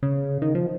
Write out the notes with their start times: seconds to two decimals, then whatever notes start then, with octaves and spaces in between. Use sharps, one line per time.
0.03 C#3
0.42 D#3
0.55 F3